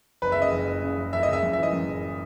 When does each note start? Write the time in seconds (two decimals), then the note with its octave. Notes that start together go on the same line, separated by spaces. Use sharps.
0.22 F#1 B4
0.32 E5
0.37 C#3 D#5
0.52 F#1
0.67 F#1
0.82 C#3
0.97 F#1
1.13 F#1 E5
1.23 D#5
1.28 C#3 E5
1.43 F#2
1.53 E5
1.58 E3 D#5
1.73 F#2
1.88 F#1